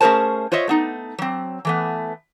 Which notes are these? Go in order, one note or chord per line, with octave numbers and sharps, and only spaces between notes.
A3 C#4 G#4 A#4 C5 A5
F4 C5 C#5 D#5 E5
A3 B3 D#4
F#3 C4
E3 A3 B3